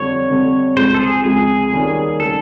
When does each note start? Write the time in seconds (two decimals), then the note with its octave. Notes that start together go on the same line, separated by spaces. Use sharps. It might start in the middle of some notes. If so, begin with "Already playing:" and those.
Already playing: F2 D3 G3 C4 C#5
0.28 F2 D3 G3 C4
0.76 C#2 C3 F3 G#3 C5
0.94 A4
1.00 G#4
1.24 C#2 C3 F3 G#3 G#4
1.73 D#2 D#3 G3 A#3 C#4
2.20 D#3 G3 A#3 C#4 A4